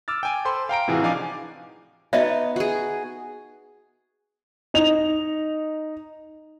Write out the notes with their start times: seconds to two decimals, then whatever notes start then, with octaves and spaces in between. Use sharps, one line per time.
0.08 D6 E6 F6 A6
0.23 G5 G#5
0.45 A4 C5 B5 C6
0.69 F5 G5 A#5 D7
0.88 A2 C3 E3 F4 F#4 G#4
1.02 F3 D4 D#4 F5 G#5 D6
2.13 B3 D#4 F#4 D#5 E5
2.56 F#4 G#4
4.74 D#4 F7